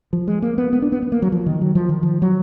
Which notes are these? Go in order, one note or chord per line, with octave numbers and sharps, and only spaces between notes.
F3
G#3
A#3
B3
B3
D4
B3
B3
A#3
F#3
F3
D#3
F#3
F3
D#3
F3
F#3